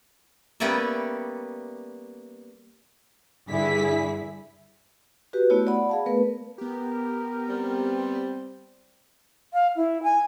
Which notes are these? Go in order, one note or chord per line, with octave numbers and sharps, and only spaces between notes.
G3 A#3 B3 C#4 D5 E5
G2 D3 E4 G#4 B6
F#4 G4 B4
A3 B3 E4 F#4 C#5
D5 F#5 B5
G#4 F5 A5
A3 B3 A#4 B4
B3 G4 A#4
G3 C4
F5
E4
G#5